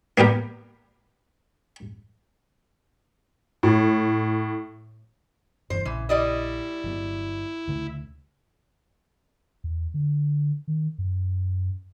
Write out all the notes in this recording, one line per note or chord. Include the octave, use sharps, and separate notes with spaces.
A#3 B3 G4 A#4
A2
F#1 G2 E3 C5
A#1 C#3 E3
G3 E4 D5 D#5
G1 F#3 B3
D2 C#3 A3
E2
D3
D#3
F#2